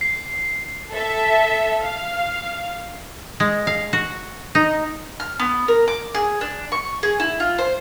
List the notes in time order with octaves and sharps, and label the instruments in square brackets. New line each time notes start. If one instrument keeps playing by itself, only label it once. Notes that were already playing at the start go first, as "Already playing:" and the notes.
[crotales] C7
[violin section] A4 E5
F5
[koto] G#3
F5
F#4
D#4
[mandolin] F6
B3
A#4
D6
G#4
D4
C#6
G#4
E4
F4
C5